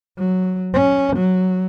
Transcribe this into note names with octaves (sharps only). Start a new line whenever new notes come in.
F#3
C#4
F#3